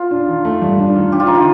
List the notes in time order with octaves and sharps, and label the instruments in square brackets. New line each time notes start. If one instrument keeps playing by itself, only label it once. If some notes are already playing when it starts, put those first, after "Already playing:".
Already playing: [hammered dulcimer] F4
[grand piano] D4
D#3
A3
G2
D4
D#3
[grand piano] D4 [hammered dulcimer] G4
[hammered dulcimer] F4
[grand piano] D3 [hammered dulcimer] D#4
[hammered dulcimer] F4